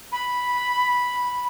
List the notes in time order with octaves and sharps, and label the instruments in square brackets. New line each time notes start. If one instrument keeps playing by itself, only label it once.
[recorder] B5